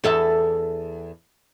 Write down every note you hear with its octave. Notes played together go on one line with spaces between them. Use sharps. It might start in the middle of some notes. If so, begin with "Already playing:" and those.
E2 A4 E5